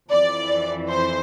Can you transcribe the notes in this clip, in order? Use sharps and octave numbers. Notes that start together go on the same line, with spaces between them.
F2 E3 D5
C5